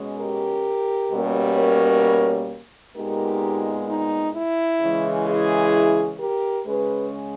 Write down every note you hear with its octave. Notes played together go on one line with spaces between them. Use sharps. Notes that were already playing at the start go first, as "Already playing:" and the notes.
Already playing: B2 G#3 C#4
G4 A#4
B2 G3 A#3 C#4
A#4 C#5
A#2 G#3 B3 D#4 G4 A#4
D#4
E4
C#3 E3 G#3
E4 G#4
G4 A#4
C#3 G#3 C#4 G#4 B4